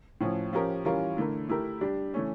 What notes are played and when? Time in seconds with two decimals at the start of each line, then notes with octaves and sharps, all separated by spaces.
0.21 A2 F3 C#4
0.53 F3 C#4 G4 A#4
0.85 E3 G3 C#4 F4 A#4
1.17 D3 A3 E4 A#4
1.49 A3 E4 G4 A#4
1.81 G3 D4 G4
2.14 E3 A3 C#4